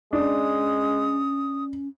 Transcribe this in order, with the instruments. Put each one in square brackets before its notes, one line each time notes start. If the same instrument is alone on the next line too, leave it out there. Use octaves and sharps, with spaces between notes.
[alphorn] G#3 [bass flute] C#4 [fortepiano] D4 [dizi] D#6